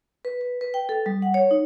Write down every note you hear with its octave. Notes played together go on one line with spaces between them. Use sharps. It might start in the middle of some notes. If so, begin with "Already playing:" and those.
B4
B4
B4
G5
A4
G3
F#5
C#5
D#4